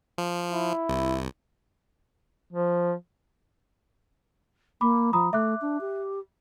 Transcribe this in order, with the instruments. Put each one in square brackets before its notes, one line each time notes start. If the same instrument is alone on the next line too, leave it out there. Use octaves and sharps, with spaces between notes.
[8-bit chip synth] F3
[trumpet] E4
[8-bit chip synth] C2
[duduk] F3
[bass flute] A#3 [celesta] B5 D6
[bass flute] F3 [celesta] A#5 B5 D#6
[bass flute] A3 [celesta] E5 D6 F#6
[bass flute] D4
G4